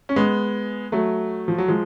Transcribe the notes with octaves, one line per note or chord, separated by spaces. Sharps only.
C#4
G#3 B3
F#3 A3
F3
F#3
F3 G#3